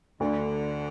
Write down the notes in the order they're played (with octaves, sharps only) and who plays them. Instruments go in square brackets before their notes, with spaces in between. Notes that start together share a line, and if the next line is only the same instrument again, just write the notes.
[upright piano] D2 [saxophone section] D3